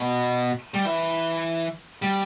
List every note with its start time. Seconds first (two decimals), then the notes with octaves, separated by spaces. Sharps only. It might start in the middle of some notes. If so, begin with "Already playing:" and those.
Already playing: B2
0.74 G3
0.85 E3
2.02 G3